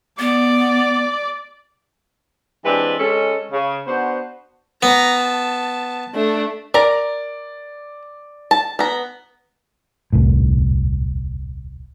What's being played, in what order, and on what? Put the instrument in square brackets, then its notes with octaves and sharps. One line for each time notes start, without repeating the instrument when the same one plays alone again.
[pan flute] B3 [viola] D5
[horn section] E3 G#3 C4 D4 G4 B4
G#3 C#4 A4
C#3
B3 D4 F#4 C5
[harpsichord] B3 [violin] A#5
[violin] A5
A3 D4
[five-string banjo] A#4 A#5 [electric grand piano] D5
[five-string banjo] A5
B3 A#5
[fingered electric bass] D#1 C2 F2 A2